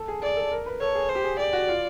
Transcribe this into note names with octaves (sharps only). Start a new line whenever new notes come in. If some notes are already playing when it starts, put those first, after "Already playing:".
Already playing: A4
G#4
G#4 D5
A4
A#4
B4
A4 C#5
G#4
C5
G4
G#4
G4 D5
F#4
F4